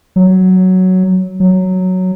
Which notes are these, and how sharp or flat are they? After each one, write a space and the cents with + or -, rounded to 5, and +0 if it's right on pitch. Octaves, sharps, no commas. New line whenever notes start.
F#3 +5
F#3 +0